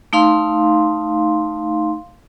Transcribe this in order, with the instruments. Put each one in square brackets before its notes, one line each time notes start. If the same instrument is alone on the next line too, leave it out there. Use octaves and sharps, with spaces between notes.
[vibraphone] A3 D#4 F5 C6